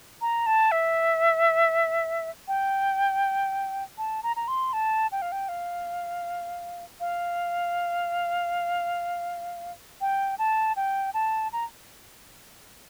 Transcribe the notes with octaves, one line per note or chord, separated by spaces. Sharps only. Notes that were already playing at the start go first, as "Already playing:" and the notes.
A#5
A5
E5
G5
A5
A#5
A#5
C6
A5
G5
F5
G5
F5
F5
G5
A5
G5
A5
A#5